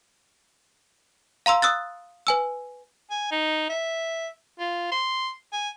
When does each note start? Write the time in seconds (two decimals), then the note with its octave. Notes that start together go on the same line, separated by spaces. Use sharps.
1.46 F5 A#5 C6 E6
1.62 D#6 E6 F#6 A6
2.27 B4 G#5 E6
3.10 G#5
3.31 D#4
3.70 E5
4.60 F4
4.92 C6
5.53 G#5